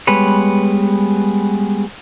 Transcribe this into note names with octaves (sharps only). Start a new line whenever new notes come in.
G3 G#3 B3 B4 C#5